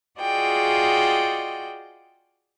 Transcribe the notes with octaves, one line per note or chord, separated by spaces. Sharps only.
F4 F#4 G#4 D5 D#5 G5